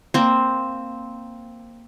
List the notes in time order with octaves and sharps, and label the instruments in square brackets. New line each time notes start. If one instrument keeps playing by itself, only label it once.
[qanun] A#3 C4